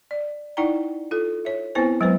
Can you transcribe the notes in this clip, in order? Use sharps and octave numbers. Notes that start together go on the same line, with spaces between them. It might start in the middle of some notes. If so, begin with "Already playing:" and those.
D5
D#4 E4 D5 F#5 G5 A#5
F4 A4
C#5 E5
B3 C4 E4 B4 C5 G#5
F#3 G#3 B3 B4 C5